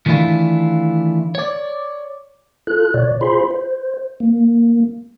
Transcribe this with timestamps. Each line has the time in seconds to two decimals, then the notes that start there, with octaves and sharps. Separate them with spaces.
0.06 D#3 E3 A3 D4 E4 F4
1.35 C#5 D5
2.67 F4 A4 F#6
2.94 B2 C#5 D5
3.21 F4 G#4 C5 B5 C6
3.51 C5
4.20 A#3